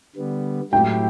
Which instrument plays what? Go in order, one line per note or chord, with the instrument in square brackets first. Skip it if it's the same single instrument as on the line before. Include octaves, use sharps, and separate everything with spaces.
[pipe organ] D3 G3 B3
[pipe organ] A2 F#3 A3 E4 G4 [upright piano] G5